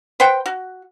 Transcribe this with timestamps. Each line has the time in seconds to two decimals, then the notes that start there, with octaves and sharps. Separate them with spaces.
0.20 B4 C5 F#5 G5
0.46 F#4